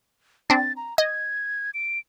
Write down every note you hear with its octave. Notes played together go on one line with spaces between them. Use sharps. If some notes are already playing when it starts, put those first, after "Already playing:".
C4 D4 A6
A#5
D#5 G#6
D7